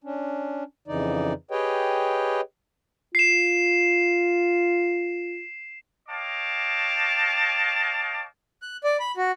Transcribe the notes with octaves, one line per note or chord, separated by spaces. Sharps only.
C#4 D4
F2 C#3 E3 D#4 D5
G4 G#4 B4 C#5 D#5 G5
F4 C7 E7
C#5 D#5 F5 G5 A5 D6
F#6
D5
B5
F#4